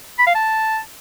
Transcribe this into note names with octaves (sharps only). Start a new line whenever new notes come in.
B5
F5
A5